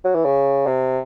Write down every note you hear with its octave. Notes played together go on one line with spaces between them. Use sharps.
F#3
E3
C#3
C3